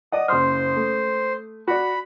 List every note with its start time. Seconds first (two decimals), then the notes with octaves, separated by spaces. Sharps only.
0.12 D5 D#5 F#5 D#6
0.28 F#1 C5 C6 D#6 F6
0.76 A3
1.68 F#4 D5 B5